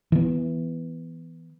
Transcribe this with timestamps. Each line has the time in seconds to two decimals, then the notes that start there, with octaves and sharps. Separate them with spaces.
0.12 E3 B3